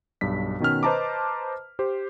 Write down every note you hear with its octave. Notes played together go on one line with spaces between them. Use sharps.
B1 G2 B6
B2 D#3 C#4 F6
B4 C5 D#5 A5 A#5 D6
G4 C5